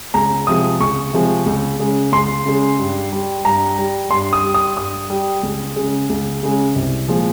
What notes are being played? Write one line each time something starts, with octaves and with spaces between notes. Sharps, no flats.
C#2 A#5
C3 F3 G#3 D#6
C#2 C#6
C3 F3 G#3
C#2
C#3 G#3
C#2 C6
C#3 G#3
G2
G3
G2 A#5
G3
G2 C6
D#6
G3
D#6
G2 D#6
G3
C#2
C#3 G#3
C#2
C#3 G#3
C2
A#2 F3 G#3